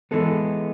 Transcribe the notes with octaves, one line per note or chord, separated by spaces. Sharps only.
E3 G#3 B3 A4